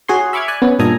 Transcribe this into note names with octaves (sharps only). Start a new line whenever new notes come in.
F#4 G#4 C#5 C6
E5 B5 C#6 D6 F6 G#6
D5 G#5 F#6
B3 C#4
G2 A#2 A4 D#5 G#5 A#5